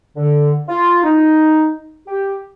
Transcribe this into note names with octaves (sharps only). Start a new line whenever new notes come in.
D3
F4
D#4
G4